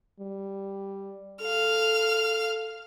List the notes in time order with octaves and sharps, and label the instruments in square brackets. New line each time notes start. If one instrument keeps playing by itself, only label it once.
[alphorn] G3
[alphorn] A4 [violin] F5 F6